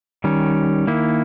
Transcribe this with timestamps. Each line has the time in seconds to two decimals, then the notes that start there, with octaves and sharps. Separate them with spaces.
0.24 D#3 G3 C#4
0.87 D#3 A#3 E4